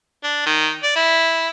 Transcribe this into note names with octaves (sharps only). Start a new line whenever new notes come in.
D4
D#3
D5
E4